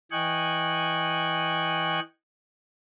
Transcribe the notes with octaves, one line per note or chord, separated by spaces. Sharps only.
E3 D#5 G5 G#5 C#6 F#6